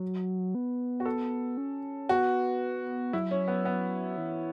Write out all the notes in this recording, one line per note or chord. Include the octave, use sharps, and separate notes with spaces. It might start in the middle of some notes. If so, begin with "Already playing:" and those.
Already playing: F#3
B3
F#4
A4
C#4
B3 F#4
F#3 E4
C#4
B3
B3
E3